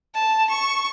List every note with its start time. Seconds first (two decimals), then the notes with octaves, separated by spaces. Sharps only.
0.14 A5
0.50 C#6